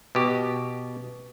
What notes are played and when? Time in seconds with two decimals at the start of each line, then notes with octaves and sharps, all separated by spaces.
0.15 B2 G4